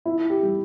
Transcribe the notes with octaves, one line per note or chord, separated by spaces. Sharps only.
E4
G4
G3